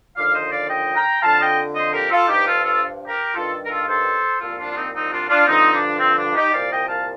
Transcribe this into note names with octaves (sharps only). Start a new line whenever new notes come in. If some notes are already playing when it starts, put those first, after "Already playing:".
D#2 D3 F3 D5 F5
C5 D#5
D5 F5
D#5 G5
G5 A#5
F2 D3 F3 F5 A5
D#5 G5
C5 D#5
G4 A#4
F4 A4
G2 F3 D#4 G4
F4 A4
F4 A4
G4 A#4
G2 D#3 F4 A4
A#4
F4 A4
A4 C5
C2 A#2 F3 F4 A4
D4 F4
F4
C4 D#4
C4 D#4
D4 F4
D4 F4
G2 D3 F3 C4 D#4
D4
C4
D4
D#4 G4
C2 A#2 F3 D5 F5
D#5 G5
F5 A5